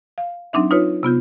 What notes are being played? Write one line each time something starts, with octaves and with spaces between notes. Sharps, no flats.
F5
F#3 C4 D4 D#4 E5
D#4 F4 B4 C#5
C3 B3 F4 G6